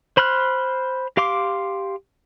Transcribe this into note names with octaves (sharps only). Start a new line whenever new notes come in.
C5 B5 C6 F6 F#6
G4 F5 C6 D6